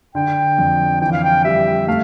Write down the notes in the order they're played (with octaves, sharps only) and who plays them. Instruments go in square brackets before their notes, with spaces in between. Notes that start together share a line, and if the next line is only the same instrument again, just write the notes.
[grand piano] D3 [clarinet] G5
[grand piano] F2
[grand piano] E3 [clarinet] G5
[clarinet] F5
G5
[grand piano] G3 [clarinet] E5
[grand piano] A3 [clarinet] F5